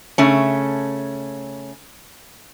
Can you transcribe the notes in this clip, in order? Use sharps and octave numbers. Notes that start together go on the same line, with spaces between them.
C#3 A3 C#4